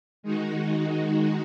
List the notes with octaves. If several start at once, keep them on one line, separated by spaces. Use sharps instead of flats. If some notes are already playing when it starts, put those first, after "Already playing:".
D#3 G#3 D#4 F#4